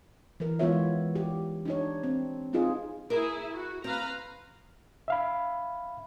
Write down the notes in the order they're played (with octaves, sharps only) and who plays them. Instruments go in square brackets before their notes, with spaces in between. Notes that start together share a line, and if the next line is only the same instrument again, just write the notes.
[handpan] E3 A#4
E3 G#3 B3 F4 C#5 E5
G4
D4 D#4 C#5
C4
C4 D#4 F4 G#4
[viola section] E4 G#4 [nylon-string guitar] A#4
[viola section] F#4
[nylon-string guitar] C4 [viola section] B4 F5 A#5
[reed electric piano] E5 F5 B5